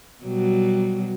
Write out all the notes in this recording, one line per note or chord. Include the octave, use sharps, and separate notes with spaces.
B2 F#3 G3